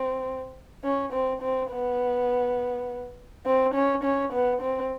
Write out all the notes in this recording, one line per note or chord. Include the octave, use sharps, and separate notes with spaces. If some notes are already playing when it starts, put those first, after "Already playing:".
Already playing: C4
C#4
C4
C4
B3
C4
C#4
C#4
B3
C4